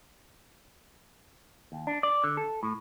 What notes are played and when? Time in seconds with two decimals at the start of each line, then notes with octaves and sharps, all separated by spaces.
1.72 D#2
1.87 D4
2.03 D5
2.24 D3
2.37 A4
2.63 A2